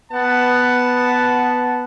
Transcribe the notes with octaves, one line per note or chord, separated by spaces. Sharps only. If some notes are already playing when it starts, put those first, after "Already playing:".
B3 F#5 A5